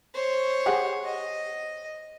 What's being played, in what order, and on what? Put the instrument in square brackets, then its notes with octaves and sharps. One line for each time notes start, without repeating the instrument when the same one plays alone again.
[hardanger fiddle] C5 C#5
[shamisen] G4 G#4 F#5
[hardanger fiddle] D#5